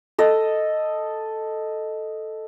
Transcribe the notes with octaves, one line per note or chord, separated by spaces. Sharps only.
A4 D#5